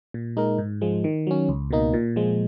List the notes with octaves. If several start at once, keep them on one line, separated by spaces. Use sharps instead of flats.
A#2
G#3 D#4 A#4
G#2
F3 G#3
D#3
F#3 C#4
C#2
B2 A#3 D#4
A#2
F3 G#3